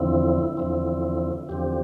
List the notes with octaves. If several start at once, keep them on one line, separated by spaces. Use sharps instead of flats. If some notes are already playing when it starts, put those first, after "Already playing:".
Already playing: E2 D3 F3 C4 E4
E2 D3 F3 C4
E2 D3 F3 C4 G4